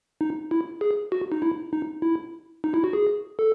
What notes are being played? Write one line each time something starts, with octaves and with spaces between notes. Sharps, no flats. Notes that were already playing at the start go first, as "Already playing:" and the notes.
D#4
E4
G#4
F#4
D#4
E4
D#4
E4
D#4
E4
F#4
G#4
A4